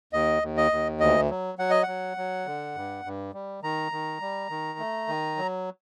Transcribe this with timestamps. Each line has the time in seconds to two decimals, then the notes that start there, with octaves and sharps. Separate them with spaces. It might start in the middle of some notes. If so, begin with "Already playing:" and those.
0.13 D#2 D#5
0.43 D#2
0.57 D#5
0.71 D#2
1.00 D2 D#5
1.30 F#3
1.59 F#3 F#5
1.70 D#5
1.83 F#3 F#5
2.17 F#3
2.46 D3
2.75 G2
3.05 G2
3.34 G3
3.62 D#3 A#5
3.92 D#3
4.21 G3
4.50 D#3
4.79 A3
5.08 D#3
5.38 F#3